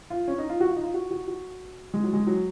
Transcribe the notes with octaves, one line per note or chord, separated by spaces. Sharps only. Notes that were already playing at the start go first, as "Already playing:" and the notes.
F4
C#4
D#4
F4
F#4
F4
D#4
F4
F#4
F#4
F#4
G#3
F#3
G#3
F#3